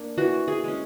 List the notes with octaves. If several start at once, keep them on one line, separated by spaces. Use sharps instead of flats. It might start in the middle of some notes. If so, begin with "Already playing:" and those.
Already playing: A#3 D4
E3 F#4
G#4
G#3 C#4